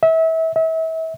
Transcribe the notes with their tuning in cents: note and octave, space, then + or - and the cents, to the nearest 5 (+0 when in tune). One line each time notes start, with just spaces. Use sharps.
E5 -30
E5 -35